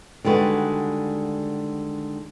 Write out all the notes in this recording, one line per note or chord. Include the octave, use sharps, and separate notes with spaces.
D3 D#3 G3 G#3 F#4 B4